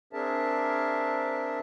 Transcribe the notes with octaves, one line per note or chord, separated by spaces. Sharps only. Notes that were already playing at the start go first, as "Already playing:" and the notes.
C4 D4 G#4 A#4 E5 A5